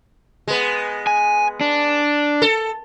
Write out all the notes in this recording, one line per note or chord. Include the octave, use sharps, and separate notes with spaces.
G#3 B3
G#5
D4
A4